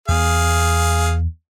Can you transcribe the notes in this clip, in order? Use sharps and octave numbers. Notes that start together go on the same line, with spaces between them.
E2 B3 G#4 F5